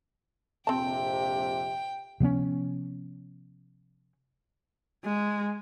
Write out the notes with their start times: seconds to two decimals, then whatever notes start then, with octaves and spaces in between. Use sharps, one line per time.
0.67 A#1 F2 C3 C4 G5 A5
2.20 C3 F3 B3 C#4
5.04 G#3